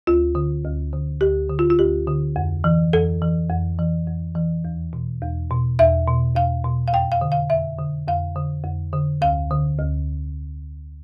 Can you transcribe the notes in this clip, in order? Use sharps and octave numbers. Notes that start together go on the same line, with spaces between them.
D2 F4
D3
D2
D3
D2 G4
D3
F4
F4
D2 G4
D3
F2
E3
F2 A4
E3
F2
E3
F2
E3
E2
B2
E2
B2
E2 E5
B2
E2 F5
B2
F5
F2 G5
F5
D3
F5
F2 E5
D3
F2 F5
D3
F2
D3
D2 F5
D3
D2